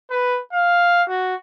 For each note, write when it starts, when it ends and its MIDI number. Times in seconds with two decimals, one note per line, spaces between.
0.10 0.39 71
0.52 1.02 77
1.08 1.34 66